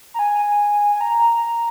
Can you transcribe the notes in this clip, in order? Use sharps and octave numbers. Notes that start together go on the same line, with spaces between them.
A#5
G#5
G#5
A#5